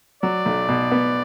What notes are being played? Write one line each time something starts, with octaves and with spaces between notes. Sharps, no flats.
F#3 D5
B1
B2
B3